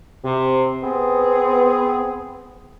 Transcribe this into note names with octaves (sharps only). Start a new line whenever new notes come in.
C3
B3 C4 G#4